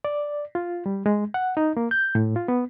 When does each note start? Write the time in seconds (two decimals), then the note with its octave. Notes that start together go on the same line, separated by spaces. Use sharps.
0.05 D5
0.55 F4
0.86 G3
1.06 G#3
1.34 F#5
1.57 D#4
1.77 A#3
1.91 G6
2.15 A2
2.36 F4
2.48 B3